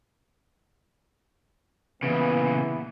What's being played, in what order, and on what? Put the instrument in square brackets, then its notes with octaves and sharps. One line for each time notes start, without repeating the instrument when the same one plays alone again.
[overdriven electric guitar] A#2 C#3 [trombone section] E3 B3